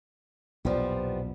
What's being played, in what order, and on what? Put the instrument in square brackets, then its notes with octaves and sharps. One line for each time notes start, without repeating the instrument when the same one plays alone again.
[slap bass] B1 E2 A#2 [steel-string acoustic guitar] F3 G3 B3